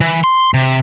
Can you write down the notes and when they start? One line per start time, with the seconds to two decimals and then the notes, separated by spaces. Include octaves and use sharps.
0.01 E3
0.24 C6
0.54 C3